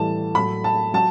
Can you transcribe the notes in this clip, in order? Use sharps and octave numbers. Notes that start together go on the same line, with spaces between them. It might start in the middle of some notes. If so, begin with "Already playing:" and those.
Already playing: A2 E3 G3 A5
A2 F#3 B5
A5
F#3 A5